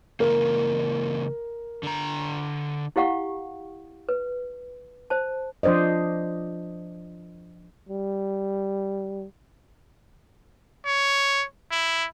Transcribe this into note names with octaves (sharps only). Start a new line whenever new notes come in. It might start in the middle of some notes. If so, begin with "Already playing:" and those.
C#3 E3 A#3 A#4
D3 A#5
E4 G4 F5 F#5 C#6
B4
C5 A5
F3 D4 C5 D5 D#5
G3
C#5
E4